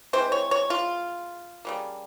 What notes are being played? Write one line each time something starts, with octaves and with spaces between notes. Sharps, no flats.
E3 G#3 C4 C5
C#5
C#5
F4
C#3 G3 A#3